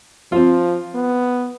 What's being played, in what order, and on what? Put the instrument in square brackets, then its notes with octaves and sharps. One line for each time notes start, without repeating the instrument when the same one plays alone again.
[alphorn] F3 [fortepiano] C4 F4
[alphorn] B3